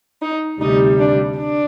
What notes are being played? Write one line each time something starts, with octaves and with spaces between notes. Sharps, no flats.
D#4
D2 C3 G3 D#4
D4
D4